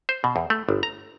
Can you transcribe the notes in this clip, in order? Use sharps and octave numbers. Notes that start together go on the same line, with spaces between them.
C5
B2
E2
A3
G1
A#5